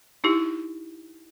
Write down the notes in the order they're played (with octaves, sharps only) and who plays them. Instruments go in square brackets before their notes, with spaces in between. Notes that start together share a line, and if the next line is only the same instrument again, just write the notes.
[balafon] D#4 E4 G4